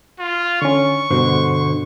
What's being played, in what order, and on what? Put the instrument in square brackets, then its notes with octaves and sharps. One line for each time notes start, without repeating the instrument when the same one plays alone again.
[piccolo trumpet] F4
[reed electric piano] D3 C#4 [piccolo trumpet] C#6
[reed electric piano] G2 B2 F#4 [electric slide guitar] D3 C5